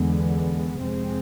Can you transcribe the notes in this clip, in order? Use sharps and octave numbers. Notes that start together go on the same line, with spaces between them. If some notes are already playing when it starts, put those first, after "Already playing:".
Already playing: E2 D3 G#3 B3
F2 C3 G#3 C4